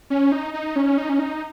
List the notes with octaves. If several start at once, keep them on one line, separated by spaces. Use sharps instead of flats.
C#4
D#4
D#4
C#4
D#4
C#4
D#4